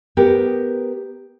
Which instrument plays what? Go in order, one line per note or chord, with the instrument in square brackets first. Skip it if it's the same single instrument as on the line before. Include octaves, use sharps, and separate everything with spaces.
[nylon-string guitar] B3 G4 A#4